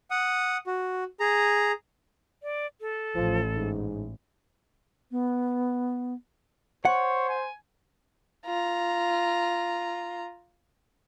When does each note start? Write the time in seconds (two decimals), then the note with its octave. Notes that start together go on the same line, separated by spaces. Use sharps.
0.11 F#5 D#6
0.67 F#4
1.20 G#4 A#5
2.43 D5
2.81 A4
3.15 A1 F3
3.54 G#2
5.11 B3
6.85 C5 C#5 F#5
7.29 G#5
8.46 F4 A#5